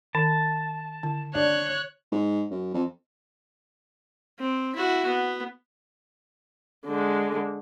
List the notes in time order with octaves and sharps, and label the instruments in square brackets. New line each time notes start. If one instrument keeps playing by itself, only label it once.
[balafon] D#3 [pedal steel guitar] A5
[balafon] D3
[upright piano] D4 [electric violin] C#5 F#6
[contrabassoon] G#2
F#2
F2
[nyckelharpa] C4
E4 F#4
B3
[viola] D3 G#3